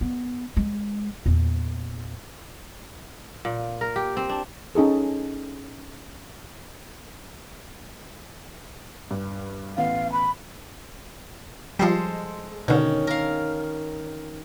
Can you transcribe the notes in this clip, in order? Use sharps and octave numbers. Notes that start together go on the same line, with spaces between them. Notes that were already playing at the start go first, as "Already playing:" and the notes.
B3
G#3
E2 A#2
A#2
A#4
G4
C4
D4
C#4 D#4 G#4 A4
G2
A1 B3 F5
B5
F3 G3 G#3 A4 C5
B2 D3 D#3 C#4
A#4 F5